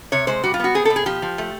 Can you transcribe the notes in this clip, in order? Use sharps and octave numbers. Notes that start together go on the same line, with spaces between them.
C3 C#5
G#3 C5
G3 F#4
F4
B3 F#4
C4 G#4
A4
B2
G#4
F3 G4
F3
A3